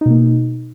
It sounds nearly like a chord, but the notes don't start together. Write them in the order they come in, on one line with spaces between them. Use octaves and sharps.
D#4 B2 A#3